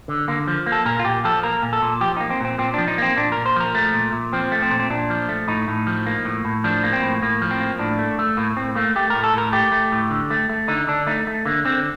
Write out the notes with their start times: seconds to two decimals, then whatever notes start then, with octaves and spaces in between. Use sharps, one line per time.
0.08 D3
0.28 D3 A#3
0.47 F3
0.66 A#3
0.72 A4
0.85 A#2 A#4
0.99 F4
1.05 A#2 G4
1.24 F3 A4
1.43 A#3 A#4
1.62 A#2
1.73 A4
1.82 A#2
2.01 F3 G4
2.17 A#3 D#4
2.30 C4
2.41 A#2 C4
2.59 A#2 C4
2.74 F3 D4
2.88 D#4
2.98 A#3 C4
3.17 A#2 D4
3.32 A#2 A#4
3.46 C5
3.56 F3 A#4
3.75 A3
3.94 A#2
4.13 A#2
4.33 F3 C4
4.52 A3
4.62 C4
4.71 A#2
4.79 C4
4.90 A#2 D4
5.10 F3
5.29 A3
5.48 A2 D#4
5.68 A2
5.87 F3
6.06 A#3
6.25 A2
6.45 A2
6.64 F3 D4
6.84 A#3
6.93 C4
7.02 A2
7.22 A2 A#3
7.42 F3
7.51 C4
7.60 A#3
7.79 A2 D4
7.99 A3
8.19 A3
8.37 A2 A#3
8.56 A2 C4
8.75 A3 A#3
8.96 A3 G4
9.10 A2 A#4
9.24 A4
9.34 A2 A#4
9.53 A3 G4
9.72 A3
9.92 A2
10.10 D3
10.31 A3
10.50 A3
10.68 D3 D#4
10.87 D3 D4
11.07 A3 D#4
11.27 A3
11.46 D3 A#3
11.65 D3 C4